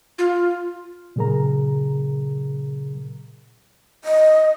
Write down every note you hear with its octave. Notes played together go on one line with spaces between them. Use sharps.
F4
A#2 C#3 F#3 G#4 A#4 A#5
D#5